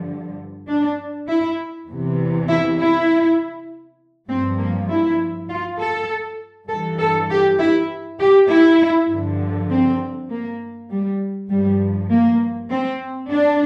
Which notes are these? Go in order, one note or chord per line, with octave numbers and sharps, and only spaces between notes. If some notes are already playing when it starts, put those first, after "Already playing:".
Already playing: G2 D3 F3
D4
E4
E2 C3 E3
E4
E4
G2 F3 C4
A#3
E4
F4
A4
G2 E3 A4
A4
G4
E4
G4
E4
G2 D3 F3
C4
A#3
G3
G2 F3 G3
A#3
C4
D4